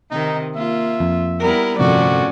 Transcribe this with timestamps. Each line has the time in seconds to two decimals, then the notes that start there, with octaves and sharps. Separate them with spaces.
0.11 C3 D#3 D#4
0.56 A#3 F4 E5
1.00 F2
1.41 G3 B3 E4 A#4
1.79 G1 F2 A2 C3 F3 C#4 F#4 D5